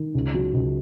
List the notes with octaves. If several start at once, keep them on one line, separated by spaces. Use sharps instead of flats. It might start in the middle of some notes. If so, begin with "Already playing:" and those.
Already playing: D#3
C#2
F#3
C#2